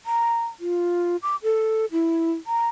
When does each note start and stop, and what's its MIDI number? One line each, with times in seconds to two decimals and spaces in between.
0.06 0.45 82
0.60 1.17 65
1.22 1.36 86
1.43 1.86 69
1.92 2.33 64
2.47 2.69 82